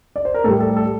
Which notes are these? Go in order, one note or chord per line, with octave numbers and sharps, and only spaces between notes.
D5
C5
A#4
A2 G3 A4
A4
A4